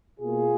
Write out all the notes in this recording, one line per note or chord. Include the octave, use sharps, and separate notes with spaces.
B2 A#3 F4 G#4